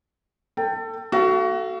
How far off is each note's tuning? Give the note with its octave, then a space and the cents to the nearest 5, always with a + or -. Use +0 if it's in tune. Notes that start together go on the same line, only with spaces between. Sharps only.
A4 +25 G5 +0
F#4 +20 A4 +0 F5 -30